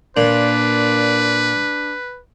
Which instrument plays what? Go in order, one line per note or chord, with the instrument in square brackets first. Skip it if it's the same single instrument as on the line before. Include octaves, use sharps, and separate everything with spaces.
[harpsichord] A#2 [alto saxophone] D4 [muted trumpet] B4